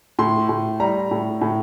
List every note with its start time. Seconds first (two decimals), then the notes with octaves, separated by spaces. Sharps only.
0.19 A2 C6
0.49 A2
0.80 G3 A#5
1.11 A2
1.41 A2